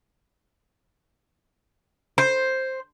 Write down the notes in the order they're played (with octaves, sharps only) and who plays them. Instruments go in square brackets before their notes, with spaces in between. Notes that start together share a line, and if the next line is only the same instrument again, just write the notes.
[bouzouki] C5